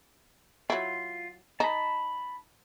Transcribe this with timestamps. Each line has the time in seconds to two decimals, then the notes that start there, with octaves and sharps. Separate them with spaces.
0.70 F#3 E4 F4
1.60 D#4 A5 B5